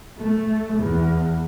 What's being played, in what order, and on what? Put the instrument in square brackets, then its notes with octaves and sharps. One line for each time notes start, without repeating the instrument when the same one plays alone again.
[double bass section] A3
E2